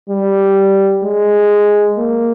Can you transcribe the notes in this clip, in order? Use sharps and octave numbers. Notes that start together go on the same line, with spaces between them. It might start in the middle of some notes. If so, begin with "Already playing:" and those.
G3
G#3
A#3